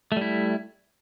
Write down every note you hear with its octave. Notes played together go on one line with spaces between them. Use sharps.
G3 A3 E4